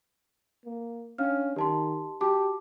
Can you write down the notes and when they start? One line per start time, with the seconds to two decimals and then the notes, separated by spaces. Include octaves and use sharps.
0.65 A#3
1.18 C#4 D4 F5 F6
1.56 D#3 G4 A5 C6
2.21 F#4 G4 A5 D6